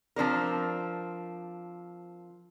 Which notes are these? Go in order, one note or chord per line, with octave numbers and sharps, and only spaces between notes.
F3 C4 D4 A#4